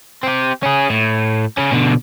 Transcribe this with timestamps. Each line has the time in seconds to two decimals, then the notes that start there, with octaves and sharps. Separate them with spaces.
0.23 C4 G4
0.63 C#4 G#4
0.90 A2
1.57 C#3 C#4
1.72 B2 D3